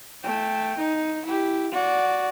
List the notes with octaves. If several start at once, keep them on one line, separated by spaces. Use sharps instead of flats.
A3 G5
D#4
E4 G4
F#4 D5